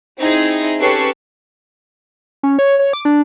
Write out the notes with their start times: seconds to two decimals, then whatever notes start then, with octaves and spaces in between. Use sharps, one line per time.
0.20 C4 D#4 E4 G#4
0.80 C#4 G4 A4 B4 C#6 C7
2.43 C#4
2.59 C#5
2.79 C#5
2.93 D6
3.05 D4